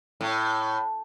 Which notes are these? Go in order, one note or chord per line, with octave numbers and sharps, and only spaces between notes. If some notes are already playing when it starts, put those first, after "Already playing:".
A2